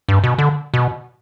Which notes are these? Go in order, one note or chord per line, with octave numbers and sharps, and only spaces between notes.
G2
B2
D3
B2